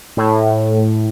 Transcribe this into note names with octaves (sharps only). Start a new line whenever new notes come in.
A2